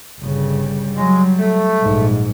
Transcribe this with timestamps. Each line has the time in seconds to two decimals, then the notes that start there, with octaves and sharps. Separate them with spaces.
0.21 G1 C#3 G3
0.95 F#3 G#3
1.37 A3
1.81 A#1 G#2